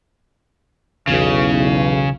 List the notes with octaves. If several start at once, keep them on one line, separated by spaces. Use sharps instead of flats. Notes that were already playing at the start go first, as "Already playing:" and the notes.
B1 E2 C#3